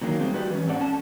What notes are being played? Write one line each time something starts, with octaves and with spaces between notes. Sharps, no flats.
A#2 D3 D#3 F#3 A#3
G3 G#3 C4
G#3 F#4 G4 B4 D5
E3 C#4
G#2 C4 A4 D5 F#5
C#4 A5